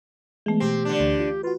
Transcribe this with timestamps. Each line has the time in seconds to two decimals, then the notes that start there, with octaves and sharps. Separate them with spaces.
0.46 E3 G#3 A3 B3
0.60 B2 C4 G4 C7
0.85 D3 D4
1.00 D2
1.19 F4
1.43 F4 F#4 B4